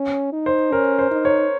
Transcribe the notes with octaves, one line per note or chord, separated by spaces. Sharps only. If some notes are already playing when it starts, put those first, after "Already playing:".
Already playing: C#4
D#4
C5
C#4 A#4
C5
D#4
C#5